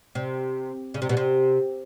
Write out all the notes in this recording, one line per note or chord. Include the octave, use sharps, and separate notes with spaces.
C3
C#3
C3
B2
C3